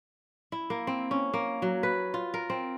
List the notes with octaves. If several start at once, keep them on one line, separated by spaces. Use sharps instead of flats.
E4
A#3
C4
C#4
A#3
F#3
B4
F4
A#4
C4